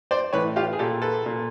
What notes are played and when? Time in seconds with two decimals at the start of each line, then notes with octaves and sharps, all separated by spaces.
0.11 C5 D5
0.33 A2 E3 B4 C#5
0.56 F4 G4
0.73 G#4
0.79 A#2 G4 A4
1.02 A4 B4
1.26 A#2